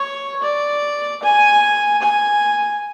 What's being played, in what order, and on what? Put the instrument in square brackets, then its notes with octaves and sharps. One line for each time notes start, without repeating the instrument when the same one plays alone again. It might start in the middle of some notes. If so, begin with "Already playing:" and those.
Already playing: [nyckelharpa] C#5
D5
G#5
G#5